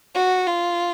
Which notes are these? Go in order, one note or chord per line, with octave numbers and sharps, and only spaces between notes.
F#4
F4